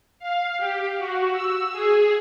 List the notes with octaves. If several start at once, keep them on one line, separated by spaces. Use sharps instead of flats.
F5
G4
F#4
E6
G#4